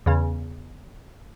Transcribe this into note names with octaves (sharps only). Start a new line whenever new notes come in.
E2 C#3